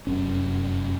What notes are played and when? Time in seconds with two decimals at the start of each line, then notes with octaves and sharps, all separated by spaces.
0.07 F1 F#2 C#4